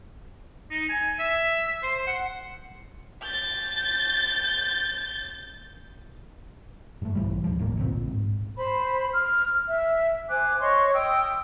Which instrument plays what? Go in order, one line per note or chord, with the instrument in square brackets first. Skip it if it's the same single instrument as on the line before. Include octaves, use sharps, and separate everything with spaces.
[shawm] D#4
G#5
E5
C5
F#5
[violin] G6 A6
[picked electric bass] G2 A3
A#1 E3 G3
D2 A2 D#3 F3
G1 A2 A#3
A1 D2 A#2 C4
G#2
[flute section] C5 B5
F6
E5
C5 G#5 D6 F#6
C#5 D#5 C6 C#6
G5 D#6 E6